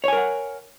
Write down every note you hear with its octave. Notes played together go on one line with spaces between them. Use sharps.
A#4 C#5 F#5 G#5